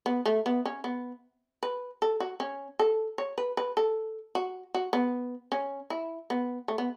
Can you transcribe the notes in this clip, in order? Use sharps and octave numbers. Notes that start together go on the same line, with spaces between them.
B3
A3
B3
C#4
B3
B4
A4
F#4
C#4
A4
C#5
B4
B4
A4
F#4
F#4
B3
C#4
E4
B3
A3
B3